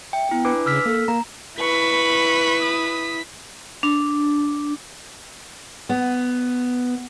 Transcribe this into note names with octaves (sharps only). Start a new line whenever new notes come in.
E5 G5
B3 E4
D4 B4 D6
C#3 E6 F6 B6
A#3 A4
A#3 A#5
E4 B4 C#6 B6
D#6
D4
B3